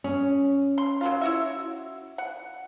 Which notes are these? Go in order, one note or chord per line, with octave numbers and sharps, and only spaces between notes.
C#4 G#4
C6
F#3 A#3 F4
E4 F#4 E5
F#5